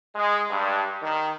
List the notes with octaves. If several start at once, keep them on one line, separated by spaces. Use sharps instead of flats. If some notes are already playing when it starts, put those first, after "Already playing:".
G#3
G2
D#3